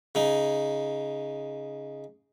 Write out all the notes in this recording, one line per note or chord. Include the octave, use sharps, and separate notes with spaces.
C#3 D#4